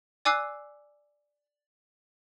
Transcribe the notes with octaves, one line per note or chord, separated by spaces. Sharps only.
D5 G#5 D6 E6 F#6 C7